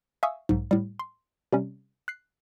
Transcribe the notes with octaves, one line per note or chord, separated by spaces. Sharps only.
E5 F5 G#5 C#6 D#6 E6
B1 G#2
A2 G3
C6
C3 G3 C#4
F#6 C7